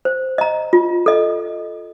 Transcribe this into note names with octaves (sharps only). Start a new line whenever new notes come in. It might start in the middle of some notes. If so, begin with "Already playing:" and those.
C5
D#5 A#5
F4
A4 D#5